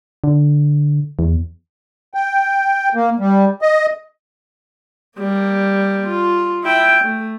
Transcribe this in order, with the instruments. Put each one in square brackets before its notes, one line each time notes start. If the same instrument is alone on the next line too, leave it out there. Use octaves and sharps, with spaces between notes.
[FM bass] D3
E2
[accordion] G5
A#3
G3
D#5
[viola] G3 A#3
F4
E4 G5
A3